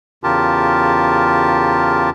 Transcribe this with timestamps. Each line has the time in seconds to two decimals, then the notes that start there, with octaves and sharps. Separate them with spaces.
0.24 E2 C#3 F4 G4 A#4 A5